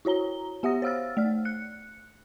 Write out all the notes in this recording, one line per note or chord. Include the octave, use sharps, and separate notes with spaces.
E4 F#4 C#5 A#5 G7
B3 G4 E5 F#5 D#6 A#6
C5 C#5 F5 E6 F6 A6
A3 D5 F6
F#6 C#7